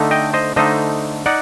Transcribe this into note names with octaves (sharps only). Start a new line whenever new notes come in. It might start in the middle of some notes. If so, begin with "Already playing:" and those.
Already playing: D3 A3 D#4
D#5 G5
C5 D#5
D3 A3 D#4 C5 D#5
D#4 D5 F#5